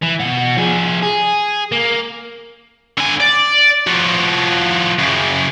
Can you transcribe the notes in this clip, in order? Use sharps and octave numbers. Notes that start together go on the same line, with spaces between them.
E3
B2 F#5
F3 G#4
G#4
A#3
D3 G#5
D5
F3 F#4
F#2 C#3